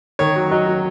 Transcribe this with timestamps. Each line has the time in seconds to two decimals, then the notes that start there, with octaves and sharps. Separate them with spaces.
0.19 D#3 C#5
0.36 F#3
0.51 F#3 D#5
0.67 F#3